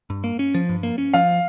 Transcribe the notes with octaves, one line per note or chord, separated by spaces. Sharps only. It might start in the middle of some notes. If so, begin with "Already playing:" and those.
G2
A#3
C#4
F3
G2
A#3
C#4
F3 F5